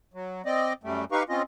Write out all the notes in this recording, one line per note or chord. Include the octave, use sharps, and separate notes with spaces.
F#3
C4 D5 D#5
F#2 G3 A3
D#4 G4 B4 F5 C#6
C4 C#4 F4 D#5